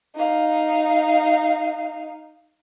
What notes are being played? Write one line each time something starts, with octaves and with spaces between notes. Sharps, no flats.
D#4 F5